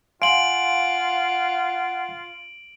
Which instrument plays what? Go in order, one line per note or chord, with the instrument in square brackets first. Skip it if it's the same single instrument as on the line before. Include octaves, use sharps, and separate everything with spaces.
[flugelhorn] F4 [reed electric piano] F5 G#5 C6 [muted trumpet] F#5 [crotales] D7 F#7